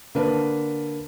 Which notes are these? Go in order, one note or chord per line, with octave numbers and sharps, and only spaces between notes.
D3 A#3 B4 A5